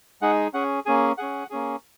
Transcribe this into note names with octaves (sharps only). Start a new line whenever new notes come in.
G#3 D#4 G#4 F#5
C#4 G#4 F#5
A#3 C#4 G#4 G#5
C#4 G#4 F#5
A#3 C#4 G#4